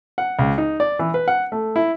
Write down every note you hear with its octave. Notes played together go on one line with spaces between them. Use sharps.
F#5
C#2
D#4
D5
E3
B4
F#5
A3
E4